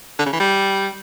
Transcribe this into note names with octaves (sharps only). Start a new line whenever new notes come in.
D3
C#3
E3
G3